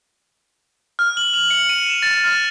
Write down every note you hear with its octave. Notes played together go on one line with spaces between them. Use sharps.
F6
F#7
F7
C#7
D#7
E7
A6
F6